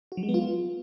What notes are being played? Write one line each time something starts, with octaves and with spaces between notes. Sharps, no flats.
F#4
F#3
G#3
B3
F4